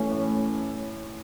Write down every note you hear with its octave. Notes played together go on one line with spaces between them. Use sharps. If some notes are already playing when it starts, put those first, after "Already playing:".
Already playing: E3 A3 C#4
A2